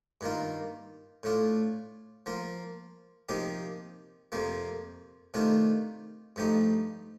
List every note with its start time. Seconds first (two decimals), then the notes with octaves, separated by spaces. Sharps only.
0.21 G2 D#3 A#3 F4
1.23 A2 A3 D4 F4
2.26 F3 A#3 F4
3.29 C3 F3 A#3 D#4 G4
4.32 F2 C3 F3 A#3
5.34 C3 D#3 A3 D4 F4
6.36 G2 F3 A3 D#4 G4